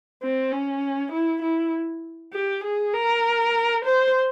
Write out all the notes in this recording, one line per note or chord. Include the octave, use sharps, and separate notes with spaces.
C4
C#4
E4
E4
G4
G#4
A#4
C5